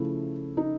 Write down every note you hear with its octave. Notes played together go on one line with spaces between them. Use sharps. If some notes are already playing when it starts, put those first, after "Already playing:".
Already playing: C#3 F3 A3 E4
D#4